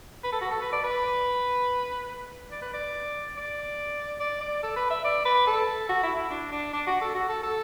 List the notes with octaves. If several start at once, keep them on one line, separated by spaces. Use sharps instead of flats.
B4
A4
F#4
A4
B4
D5
B4
D5
B4
D5
D5
D5
D5
A4
B4
E5
D5
B4
A4
F#4
E4
E4
D4
D4
D4
F#4
A4
F#4
A4
A4